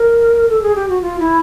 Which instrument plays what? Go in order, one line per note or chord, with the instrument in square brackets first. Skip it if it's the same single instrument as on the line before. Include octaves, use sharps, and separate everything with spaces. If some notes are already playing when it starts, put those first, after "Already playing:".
Already playing: [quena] A#4
A4
G#4
G4
F#4
F4
E4